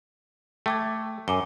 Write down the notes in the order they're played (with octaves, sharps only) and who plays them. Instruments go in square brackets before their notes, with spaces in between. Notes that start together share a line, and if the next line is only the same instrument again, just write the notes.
[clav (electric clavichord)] A3 [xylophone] G5 D6 G#6
[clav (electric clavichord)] F#2 [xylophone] G#5 D6 G7